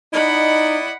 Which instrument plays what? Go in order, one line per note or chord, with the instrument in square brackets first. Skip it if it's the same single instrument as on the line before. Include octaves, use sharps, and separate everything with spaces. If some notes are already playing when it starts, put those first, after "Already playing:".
[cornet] D#4 [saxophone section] E4 D5 D#5 [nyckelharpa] F#5 B5